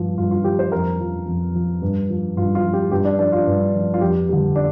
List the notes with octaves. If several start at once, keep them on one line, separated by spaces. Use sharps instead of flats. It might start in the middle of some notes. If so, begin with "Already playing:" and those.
Already playing: G2 F3
G2 F4
F4
F3 G4
C5
F2 A#4
F3
F2
F3
G2
F3
G2 F4
F4
F3
G4
G2 G4
D4
F3 D4
F4
G2
F3
F4
F2 G4
D3 G3
D4